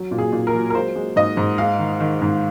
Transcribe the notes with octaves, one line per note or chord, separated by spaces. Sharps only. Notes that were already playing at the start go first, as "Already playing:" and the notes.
Already playing: F#3
A#2
G#4
A#2
A#4
F#3
A#4
G#3 C5
G#3
G#2 D#5
G#2
G#3 F5
D#3
D#3
G#2